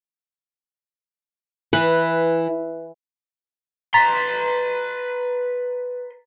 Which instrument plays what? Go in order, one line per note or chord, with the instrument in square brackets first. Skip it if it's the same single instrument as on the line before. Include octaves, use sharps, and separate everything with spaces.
[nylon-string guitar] E3 [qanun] B4
[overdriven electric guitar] B4 C6 [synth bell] A#5 A6 B6